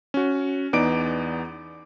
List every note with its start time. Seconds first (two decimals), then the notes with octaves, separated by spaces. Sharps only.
0.14 C#4 F#4
0.73 E2 B3 D#4 D5 D6 D7